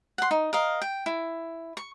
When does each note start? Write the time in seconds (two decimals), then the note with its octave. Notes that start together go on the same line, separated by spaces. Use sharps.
0.18 F#5 C6
0.31 D#4
0.53 A#4 D#5 F5
0.82 G5
1.06 E4
1.77 C#6